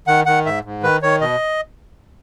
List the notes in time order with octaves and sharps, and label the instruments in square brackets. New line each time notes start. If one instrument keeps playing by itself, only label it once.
[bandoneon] D#3 F#5
D#3 F#5
G#2 E5
G#2
D#3 B4
D#3 C#5
B2 D#5